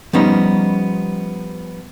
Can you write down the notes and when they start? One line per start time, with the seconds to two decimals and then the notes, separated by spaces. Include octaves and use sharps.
0.13 F3 G3 B3 C#4 D#4